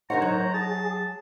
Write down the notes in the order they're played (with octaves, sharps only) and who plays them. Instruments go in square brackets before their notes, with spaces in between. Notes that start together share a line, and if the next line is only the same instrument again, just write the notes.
[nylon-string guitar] D3 A#4 F#5 [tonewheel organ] D#4 C5 C#5 [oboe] A#5
[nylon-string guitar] F#3
[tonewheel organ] G#4 [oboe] A5